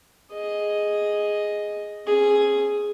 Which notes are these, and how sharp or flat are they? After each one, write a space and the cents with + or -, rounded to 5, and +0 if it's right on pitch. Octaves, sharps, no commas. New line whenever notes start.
G#4 +0 D#5 +0
C#4 -45 G#4 +0